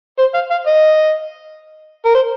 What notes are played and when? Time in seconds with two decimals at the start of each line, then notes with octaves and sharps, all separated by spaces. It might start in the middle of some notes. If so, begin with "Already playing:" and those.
0.18 C5
0.34 F5
0.51 F5
0.67 D#5
2.05 A#4
2.14 C5